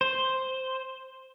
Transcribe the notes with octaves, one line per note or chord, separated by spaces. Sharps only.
C5